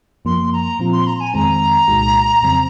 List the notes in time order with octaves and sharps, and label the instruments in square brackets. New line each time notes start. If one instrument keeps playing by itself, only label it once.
[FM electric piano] F#2 F3 A#3 [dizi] C6
[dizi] A#5
[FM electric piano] A#2 F3 C4 F4
[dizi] C6
A#5
G#5
[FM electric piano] F2 D#3 G#3 C4 [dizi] A#5
[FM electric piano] C2 A#2 G#3 D#4 F#4
F2 C#3 F#3 C4